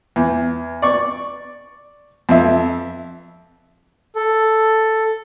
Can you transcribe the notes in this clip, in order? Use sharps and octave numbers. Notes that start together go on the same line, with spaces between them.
E2
D5 C#6
F2 E5
A4